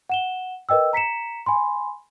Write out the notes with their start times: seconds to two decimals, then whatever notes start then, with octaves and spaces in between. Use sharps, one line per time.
0.09 F#5 E7 G7
0.69 A#4 B4 D#5 G5 E6
0.93 A#5 B6 C#7 E7
1.46 G#5 B5 C6